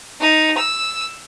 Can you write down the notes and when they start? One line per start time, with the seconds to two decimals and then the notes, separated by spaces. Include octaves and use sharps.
0.20 D#4
0.57 E6